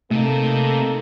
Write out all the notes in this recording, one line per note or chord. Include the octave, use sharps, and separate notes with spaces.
C3 A3 A#3 D#4 A4